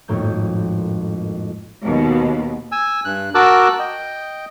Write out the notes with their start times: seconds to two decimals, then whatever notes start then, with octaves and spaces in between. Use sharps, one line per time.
0.08 G#1 F2 A2 A#3 G6
1.84 D#2 B2
2.72 G#5 E6
3.05 G2 F#6
3.35 F#4 A#4 A5 D6 E6 F#6
3.79 D#5 G5